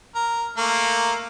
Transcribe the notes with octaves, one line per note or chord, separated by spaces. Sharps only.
A#4
A3 A#3